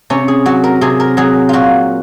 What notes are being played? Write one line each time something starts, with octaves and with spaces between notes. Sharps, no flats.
C3 C#4
G#4
F#3 F#4
A#4
C3 G#4
A#4
F#3 G#4
A#2 F4 F#4